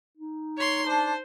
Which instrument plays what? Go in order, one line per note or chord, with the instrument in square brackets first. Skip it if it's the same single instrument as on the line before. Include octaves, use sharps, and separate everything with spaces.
[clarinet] D#4
[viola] C#5 C6
[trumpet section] D4 A5 [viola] C5